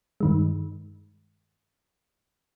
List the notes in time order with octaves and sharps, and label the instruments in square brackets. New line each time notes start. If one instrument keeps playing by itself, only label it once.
[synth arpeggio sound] G2 D#3 G#3